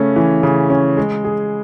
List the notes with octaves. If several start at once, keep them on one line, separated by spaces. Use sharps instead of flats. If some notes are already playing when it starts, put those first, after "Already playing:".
Already playing: C#3 A3 C#4
E3
C#3
C#4
G#3
G#4